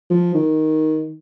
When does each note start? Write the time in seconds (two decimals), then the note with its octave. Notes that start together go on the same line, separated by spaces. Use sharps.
0.10 F3
0.34 D#3